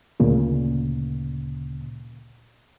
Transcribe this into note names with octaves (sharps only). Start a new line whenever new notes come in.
D2 A#2 C#3